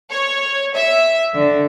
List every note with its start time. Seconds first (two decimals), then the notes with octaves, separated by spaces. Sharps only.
0.10 C#5
0.74 E5
1.35 D3